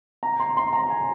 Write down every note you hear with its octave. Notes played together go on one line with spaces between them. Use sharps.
A#5
C6
C6
A#5
G#5